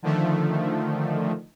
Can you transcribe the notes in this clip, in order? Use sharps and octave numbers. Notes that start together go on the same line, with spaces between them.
D3 D#3 F3 A3